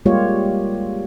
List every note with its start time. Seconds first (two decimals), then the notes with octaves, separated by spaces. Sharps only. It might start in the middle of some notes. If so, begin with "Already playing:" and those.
0.06 G3 G#3 A#3 F4 G4 C#5